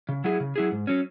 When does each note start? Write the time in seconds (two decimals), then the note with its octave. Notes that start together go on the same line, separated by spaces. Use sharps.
0.09 C#3
0.24 F#3 E4 G#4
0.40 C#3
0.56 F#3 E4 G#4
0.72 G#2
0.87 F#3 C#4